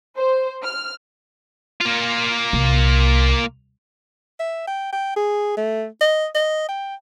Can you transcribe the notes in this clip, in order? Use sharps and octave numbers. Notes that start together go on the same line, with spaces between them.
C5
F6
A#3 F4
C2
E5
G5
G5
G#4
A3
D#5
D#5
G5